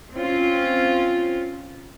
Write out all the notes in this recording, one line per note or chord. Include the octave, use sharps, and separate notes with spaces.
C4 C#4 F4